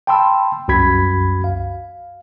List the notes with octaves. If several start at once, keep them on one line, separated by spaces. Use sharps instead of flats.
G5 A5 B5 C6 E6
C2 F#2 F#4 B5 G#6 B6
F5